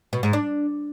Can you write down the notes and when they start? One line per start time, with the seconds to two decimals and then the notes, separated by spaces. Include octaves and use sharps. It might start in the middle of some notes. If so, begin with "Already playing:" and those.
0.13 B2
0.23 G#2
0.33 D4